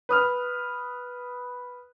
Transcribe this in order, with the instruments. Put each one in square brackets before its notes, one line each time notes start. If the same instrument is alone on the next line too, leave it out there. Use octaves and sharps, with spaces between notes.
[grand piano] B4 D#6 F6